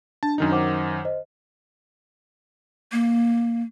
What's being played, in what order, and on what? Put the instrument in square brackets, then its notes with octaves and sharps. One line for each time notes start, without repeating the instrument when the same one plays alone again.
[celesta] D4 [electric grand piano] A5
[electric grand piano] F#2 D#3 D#4
[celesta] C5 F#5 D6
C5 D#5
[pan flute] A#3